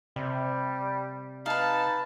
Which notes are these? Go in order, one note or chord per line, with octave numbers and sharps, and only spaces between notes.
C3 G3
D#4 B4 F5 A5